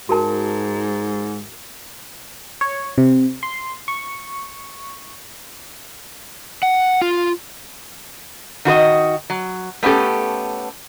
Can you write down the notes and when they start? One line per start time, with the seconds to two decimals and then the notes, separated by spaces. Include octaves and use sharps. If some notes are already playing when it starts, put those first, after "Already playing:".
0.09 G#2 F#4 A#4 A5
2.61 C#5
2.98 C3
3.43 C6
3.88 C#6
6.63 F#5
7.02 F4
8.65 D#3 F#4 B4 D#5
9.30 F#3
9.83 A3 B3 C#4 G4 A4